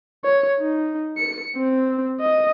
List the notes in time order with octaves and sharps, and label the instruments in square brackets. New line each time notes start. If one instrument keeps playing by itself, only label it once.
[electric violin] C#5
D#4
C#7
C4
D#5